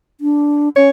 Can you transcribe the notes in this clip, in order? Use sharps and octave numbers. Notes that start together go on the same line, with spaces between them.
D4
C#4 C#5